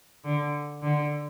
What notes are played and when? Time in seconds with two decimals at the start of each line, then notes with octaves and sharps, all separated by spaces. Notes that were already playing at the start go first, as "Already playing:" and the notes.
0.25 D3
0.83 D3